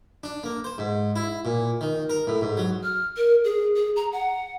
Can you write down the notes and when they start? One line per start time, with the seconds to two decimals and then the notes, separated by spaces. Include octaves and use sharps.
0.24 D4
0.44 A#3
0.64 C5
0.78 G#2
1.16 E4
1.45 A#2
1.81 D#3
2.10 A#4
2.27 A2
2.41 G#2
2.57 F#3
2.83 F6
3.17 A#4
3.44 G#4
3.76 G#4
3.96 A#5
4.13 F#5